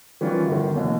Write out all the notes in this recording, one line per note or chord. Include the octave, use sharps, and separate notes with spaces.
D#3 E3 G3 C#4 F4
G1 D#3
F1 D#2